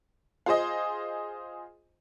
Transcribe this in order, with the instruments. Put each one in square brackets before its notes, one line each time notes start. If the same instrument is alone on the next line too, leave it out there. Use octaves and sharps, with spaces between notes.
[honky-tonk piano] F4 G#4 C5 D#5